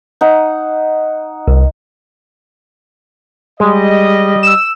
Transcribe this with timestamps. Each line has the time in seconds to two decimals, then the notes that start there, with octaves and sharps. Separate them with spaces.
0.21 D#4 F#5
1.48 C2
3.60 G3 G#3 D#5
4.43 E6 E7